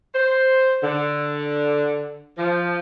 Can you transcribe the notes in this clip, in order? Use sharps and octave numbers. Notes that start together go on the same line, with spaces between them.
C5
D3
F3